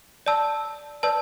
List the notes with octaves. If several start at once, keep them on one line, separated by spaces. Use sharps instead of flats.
D5 A5 E6
B4 D5 A5 E6